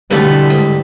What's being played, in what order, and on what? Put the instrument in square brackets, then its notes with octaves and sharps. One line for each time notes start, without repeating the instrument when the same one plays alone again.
[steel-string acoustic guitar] E2 B2 A3 [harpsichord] G2 A4 B4 [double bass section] D3
[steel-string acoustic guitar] G#2